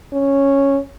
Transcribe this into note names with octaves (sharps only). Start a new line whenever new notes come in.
C#4